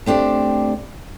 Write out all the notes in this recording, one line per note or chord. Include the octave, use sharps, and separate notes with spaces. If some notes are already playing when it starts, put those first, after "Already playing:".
A3 C4 D4 G4 D5